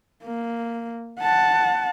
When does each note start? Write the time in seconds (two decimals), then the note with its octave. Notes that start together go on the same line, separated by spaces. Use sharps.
0.24 A#3
1.20 F#5 A5